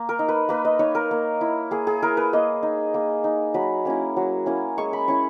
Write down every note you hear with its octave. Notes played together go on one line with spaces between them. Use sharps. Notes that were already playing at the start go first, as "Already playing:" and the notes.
Already playing: A#3
A#4
D#4
B4
A#3 B4
D#5
D#4 C#5
A#4
A#3
E4
A#3 G#4
G#4
E4 A#4
B4
A#3 D#5
D#4
A#3
D#4
F#3 B5
A#3 C#4 E4
F#3
A#3 C#4 E4
G#3 C#6
B5
C#4 E4 C#6